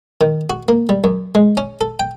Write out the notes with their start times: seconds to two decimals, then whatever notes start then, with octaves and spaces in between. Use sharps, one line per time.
0.21 D#3
0.50 F#4
0.68 A#3
0.89 G3
1.04 F#2
1.35 G#3
1.57 C#4
1.81 A4
2.00 G5